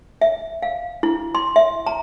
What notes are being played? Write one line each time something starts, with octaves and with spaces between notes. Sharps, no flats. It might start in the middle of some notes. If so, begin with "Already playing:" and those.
E5
F5
E4
C6
E5
A#5